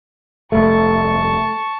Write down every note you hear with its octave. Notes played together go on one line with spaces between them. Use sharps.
F1 C2 G2 A3 A5 C#6